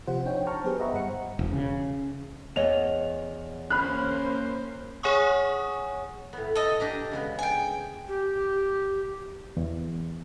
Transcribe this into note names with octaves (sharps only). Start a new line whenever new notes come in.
C3 F3 F4 G4 C5 F#5
D4 D#4 C#5 G5
C5 G5 A5 A#5 C#6 F6
F#3 B3 G4 G#4 B4 C5
D#5 E5 F#5 A#5 B5 C#6
G2 G3 C5 F#5 C#7
E1
C#3
E2 C#5 D#5 F7
A#3 C#4 C5 B5 F6 F#6
G#4 C#5 F#5 G#5 C#6 D#6
A2 B3
A4 D#5
D4 G4 A#5
C#3 G#3 B3
G5 G#5
G4
E2